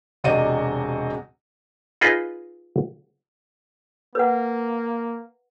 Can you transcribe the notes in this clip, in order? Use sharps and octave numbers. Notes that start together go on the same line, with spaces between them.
E1 C3 F#4 D5 D#5 D#7
D#4 F4 G#4 B4 D#5
A#3 B4 F#5